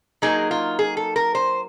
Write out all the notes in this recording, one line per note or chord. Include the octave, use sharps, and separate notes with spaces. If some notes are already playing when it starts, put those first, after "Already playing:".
F#3 A#3 D#4 G#4
F4
G#4
A4
A#4
C5